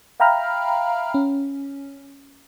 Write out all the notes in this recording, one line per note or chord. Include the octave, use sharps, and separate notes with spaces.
E5 F5 G5 A#5 B5 F6
C#4